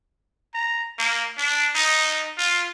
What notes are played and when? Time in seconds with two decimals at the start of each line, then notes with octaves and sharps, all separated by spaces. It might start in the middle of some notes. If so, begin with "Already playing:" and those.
0.54 A#5
0.98 A#3
1.38 D4
1.75 D#4
2.38 F4